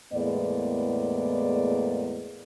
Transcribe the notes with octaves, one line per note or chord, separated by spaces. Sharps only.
E2 A2 G#3 A#3 B3 D5